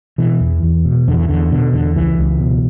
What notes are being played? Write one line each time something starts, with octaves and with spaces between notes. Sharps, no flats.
B2 E3
E2
E2
B2
E2 D3
E3
E2 D3
B2 D3
E2 D3
C#2 E3
C#2
B2